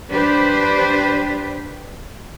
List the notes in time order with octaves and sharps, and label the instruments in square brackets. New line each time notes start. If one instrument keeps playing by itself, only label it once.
[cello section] D4 G4 B4 C5